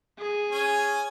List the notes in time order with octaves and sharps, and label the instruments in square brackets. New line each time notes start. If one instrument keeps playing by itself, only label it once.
[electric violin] G#4
[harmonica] C#4 G#5